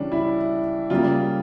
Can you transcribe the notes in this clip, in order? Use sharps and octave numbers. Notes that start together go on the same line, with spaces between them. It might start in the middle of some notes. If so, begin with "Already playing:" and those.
Already playing: C#3 E3 G3 C#4 D4
E4
C#3 G3 A#3 F4